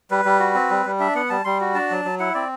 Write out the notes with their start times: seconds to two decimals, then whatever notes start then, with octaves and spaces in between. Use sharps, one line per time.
0.11 G3 B4
0.25 G3
0.40 F#4
0.55 C4
0.70 G3
0.86 G3
1.00 D4 E5
1.15 B3 F#5
1.30 G3 A5
1.45 G3 C6
1.61 F#4
1.75 D4 A5
1.91 F#3
2.05 F#3
2.19 E4 F#5
2.34 C4 D5